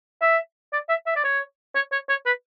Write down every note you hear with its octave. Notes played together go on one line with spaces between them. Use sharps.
E5
D5
E5
E5
D5
C#5
C#5
C#5
C#5
B4